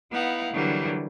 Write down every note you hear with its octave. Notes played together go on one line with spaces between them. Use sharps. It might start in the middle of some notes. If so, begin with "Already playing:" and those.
B3 D#4 E4 F5 F#5
D3 E3 F#3 G3 A#3